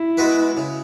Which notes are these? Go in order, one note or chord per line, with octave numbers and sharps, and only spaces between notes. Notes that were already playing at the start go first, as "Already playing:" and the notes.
Already playing: E4
G#3 B3 F#4 B4
C#3